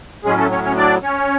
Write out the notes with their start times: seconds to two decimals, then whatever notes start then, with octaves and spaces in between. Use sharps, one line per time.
0.25 A2 F#3 G#3 C#4 G#4
0.38 A3 A4
0.51 C#4 C#5
0.63 C#4 C#5
0.77 D4 D5
1.03 C#4 C#5